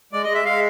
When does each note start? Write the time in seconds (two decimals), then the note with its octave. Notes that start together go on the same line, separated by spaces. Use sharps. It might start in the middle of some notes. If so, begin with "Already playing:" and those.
0.12 G#3 D5
0.23 D#5
0.29 G#3
0.34 E5
0.45 G#3 F5